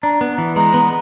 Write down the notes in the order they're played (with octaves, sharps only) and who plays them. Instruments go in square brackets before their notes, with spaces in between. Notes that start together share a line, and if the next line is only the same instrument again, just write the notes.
[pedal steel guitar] D4 [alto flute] A#5
[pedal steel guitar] B3
E3
[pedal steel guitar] G#3 [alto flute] A#5
[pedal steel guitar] B3